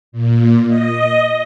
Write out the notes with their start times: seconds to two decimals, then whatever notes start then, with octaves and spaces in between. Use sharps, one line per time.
0.12 A#2
0.68 D#5